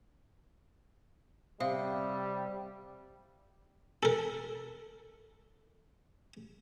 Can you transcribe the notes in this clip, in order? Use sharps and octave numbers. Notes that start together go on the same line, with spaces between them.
C3 G3 F5 D#6
A4 A#4